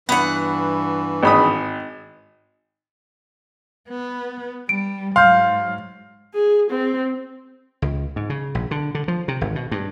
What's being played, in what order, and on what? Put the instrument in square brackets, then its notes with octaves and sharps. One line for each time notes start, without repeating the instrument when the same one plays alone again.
[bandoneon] G2 E3 [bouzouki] B3 F#5
[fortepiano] G#1 B5 D#6
[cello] B3
[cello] G3 [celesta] D7
[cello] G#2 F#3 [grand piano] F5 [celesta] C6 F6 G6
[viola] G#4
C4
[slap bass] C#2
G#2
C#3
A#1
D3
D3
F3
C3
G#1
B2
G2